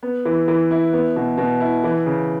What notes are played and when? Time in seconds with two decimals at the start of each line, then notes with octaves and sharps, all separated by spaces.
0.03 B3
0.25 E3
0.48 E3
0.71 E4
0.93 B3
1.16 B2
1.37 B2
1.60 E4
1.84 E3
2.06 C#3